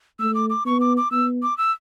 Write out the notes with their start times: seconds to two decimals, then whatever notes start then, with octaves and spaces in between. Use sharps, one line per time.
0.20 A3 E6
0.35 D6
0.50 D6
0.66 B3 C#6
0.81 D6
0.97 D6
1.11 B3 E6
1.43 D6
1.58 E6